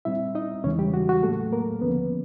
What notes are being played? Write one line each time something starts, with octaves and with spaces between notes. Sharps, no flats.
A#2 G3 C4 E4 E5
D#4 D#5
E2 C#3 E3 G#3 C#4 C#5
G3 G4
F#4
F#4
A2 F#3 A3 A#3 A4
A#3 A#4
D#2 D3 F3 A#3 B3 C#4 B4